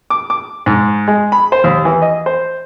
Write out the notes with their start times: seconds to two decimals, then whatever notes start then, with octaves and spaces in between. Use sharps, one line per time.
0.10 D6
0.30 D6
0.66 G#2
1.08 G#3
1.32 B5
1.52 C5
1.64 D#2
1.85 E3
2.02 D#5
2.26 C5